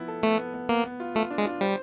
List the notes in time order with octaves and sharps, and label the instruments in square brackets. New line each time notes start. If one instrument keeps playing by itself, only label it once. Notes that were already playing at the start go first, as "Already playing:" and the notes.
Already playing: [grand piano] F3 B3 E4
A4
[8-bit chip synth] A3 [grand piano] B3
[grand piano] B3
B3
[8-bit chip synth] A#3 [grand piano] B3
[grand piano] B3
F4
[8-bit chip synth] A3 [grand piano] F4
[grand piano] D4
[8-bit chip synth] G#3
[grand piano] F4
[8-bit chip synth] G3 [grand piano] C5